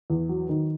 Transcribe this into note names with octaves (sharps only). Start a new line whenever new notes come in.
E2
F#3
D#3